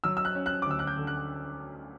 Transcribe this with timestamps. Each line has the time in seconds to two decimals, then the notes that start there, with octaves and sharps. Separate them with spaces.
0.04 F#3 E6
0.17 E6
0.25 F#6
0.35 C#4
0.46 F#6
0.62 D6
0.66 D2 E6
0.79 F#6
0.87 G6
0.97 D3
1.07 F#6